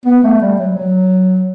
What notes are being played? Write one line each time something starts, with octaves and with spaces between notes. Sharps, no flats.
B3
A3
G3
F#3
F#3